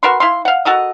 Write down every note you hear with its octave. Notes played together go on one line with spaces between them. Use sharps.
F#4 A#4 B4 C6
E4 F5 C6
F5 F#5
F#4 A4 A#4 D#5